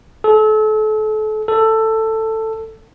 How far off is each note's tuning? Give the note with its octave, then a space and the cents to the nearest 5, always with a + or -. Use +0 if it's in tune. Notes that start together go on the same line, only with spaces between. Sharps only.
A4 -35
A4 +10